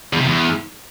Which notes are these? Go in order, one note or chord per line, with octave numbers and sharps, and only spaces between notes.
E2
C3
E2